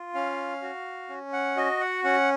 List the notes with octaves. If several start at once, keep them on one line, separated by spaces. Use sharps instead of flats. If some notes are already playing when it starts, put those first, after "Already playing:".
Already playing: F4
C#4 F5
F#4
C#4
F#5
F#4 D#5
F#5
C#4 F#5